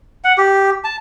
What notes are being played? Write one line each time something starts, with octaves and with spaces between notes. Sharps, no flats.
F#5
G4
A5